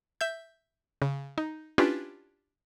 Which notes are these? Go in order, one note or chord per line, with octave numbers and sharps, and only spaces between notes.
E5 G6
C#3
D#4
C#4 D4 E4 F4 G4 B4